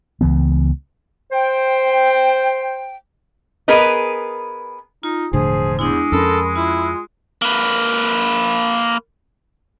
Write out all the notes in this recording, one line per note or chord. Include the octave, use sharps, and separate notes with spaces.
C#2 E3 B3
C5 G5
B3 G#4 A#4 B4 D#5
D#4 F4
E1 A2 D3 F3 G#4 C5
E2 G#3 D4 E4
F2 C#4 A4 A#4 B5 C6
E4 F4
A#3 B4